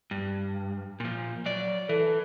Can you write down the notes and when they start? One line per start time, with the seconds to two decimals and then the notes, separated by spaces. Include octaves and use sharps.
0.11 G2
1.00 A#2 F3
1.46 F#3 D5
1.89 E3 A4